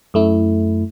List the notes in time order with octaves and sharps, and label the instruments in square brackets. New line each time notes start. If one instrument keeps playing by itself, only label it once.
[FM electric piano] F#2 A3 E4